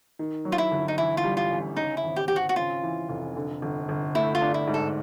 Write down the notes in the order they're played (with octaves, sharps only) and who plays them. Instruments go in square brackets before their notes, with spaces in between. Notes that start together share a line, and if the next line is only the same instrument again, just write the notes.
[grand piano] D#3
F#3
[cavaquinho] F4
E4
[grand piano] G1
[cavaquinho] D#4
[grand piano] E3 [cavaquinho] E4
[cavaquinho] F4
[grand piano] G3
[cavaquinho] F4
[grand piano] A1
[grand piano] C#3 [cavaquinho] D#4
[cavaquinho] E4
[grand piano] G#1
[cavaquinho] G4
[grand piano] G#1 [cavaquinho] G4
[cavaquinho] F#4
F#4
[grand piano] C#3 [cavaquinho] F4
[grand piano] E3
F1
D3
G1
G1
[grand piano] A3 [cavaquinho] E4
[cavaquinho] F4
[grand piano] D4
[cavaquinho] E4
[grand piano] G#2
[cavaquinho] A4